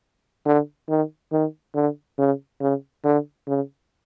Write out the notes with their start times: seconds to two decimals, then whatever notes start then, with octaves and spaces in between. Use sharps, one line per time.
0.45 D3
0.89 D#3
1.32 D#3
1.74 D3
2.18 C#3
2.60 C#3
3.04 D3
3.47 C#3